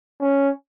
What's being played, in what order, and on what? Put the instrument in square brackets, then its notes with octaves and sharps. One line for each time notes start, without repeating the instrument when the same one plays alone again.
[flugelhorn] C#4